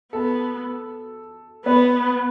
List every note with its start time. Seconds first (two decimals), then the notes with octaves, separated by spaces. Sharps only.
0.13 B3 A4
1.65 B3 B4